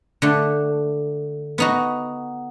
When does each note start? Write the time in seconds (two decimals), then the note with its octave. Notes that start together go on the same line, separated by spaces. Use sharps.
0.22 D3 A3
1.58 B3 D#4 F#4